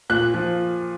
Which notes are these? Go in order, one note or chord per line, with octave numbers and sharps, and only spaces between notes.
A#2 F#6
F3